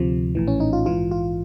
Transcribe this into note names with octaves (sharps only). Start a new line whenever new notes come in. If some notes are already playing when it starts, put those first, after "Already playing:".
Already playing: D2 C3 F3
A#1 A2 E3
C#4
D#4
F4
A#1 G#2 E3 F4
F4